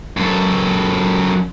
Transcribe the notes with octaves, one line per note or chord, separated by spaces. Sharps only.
F#2 A4